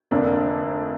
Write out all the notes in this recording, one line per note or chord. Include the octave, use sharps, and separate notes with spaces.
F1 F2 D3 A#3 D4